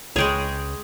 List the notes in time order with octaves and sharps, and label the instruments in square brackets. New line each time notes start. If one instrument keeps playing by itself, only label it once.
[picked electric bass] C#2 [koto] G#3 G#4 [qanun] C#5 G5